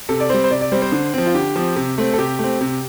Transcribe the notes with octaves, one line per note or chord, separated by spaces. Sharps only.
C3 A4
D5
G3 C4 C5
C5
C3 D5
D5
G3 C4 C5
C5
D3
F3 C4
F4
D3 G4
F3 C4
C3
A3 C4
A4
C3 G4
A3 C4
C3